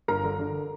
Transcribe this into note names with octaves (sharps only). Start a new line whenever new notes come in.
G1 A#4 A#5
D3
D3